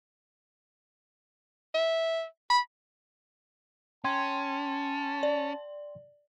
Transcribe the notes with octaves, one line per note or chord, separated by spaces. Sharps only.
E5
B5
C#4 G5 A5 C6 G#6
D5